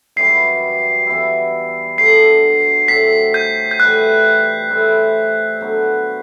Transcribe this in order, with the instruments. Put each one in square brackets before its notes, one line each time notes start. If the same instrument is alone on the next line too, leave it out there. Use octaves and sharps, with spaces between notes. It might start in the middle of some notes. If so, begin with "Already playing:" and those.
[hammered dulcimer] F#2 E3 G3 [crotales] C7
[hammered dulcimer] E3 B3 E4
[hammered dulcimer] A2 F#3 A3 D4 [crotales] C7
[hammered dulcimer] A2 F#3 C4 [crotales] B6
[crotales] G6
G6
[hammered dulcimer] A2 E3 G3 [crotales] F#6
[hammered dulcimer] A2 G3 C4 E4
D3 F#3 B3